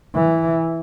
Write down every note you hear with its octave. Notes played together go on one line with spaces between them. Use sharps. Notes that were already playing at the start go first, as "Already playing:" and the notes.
E3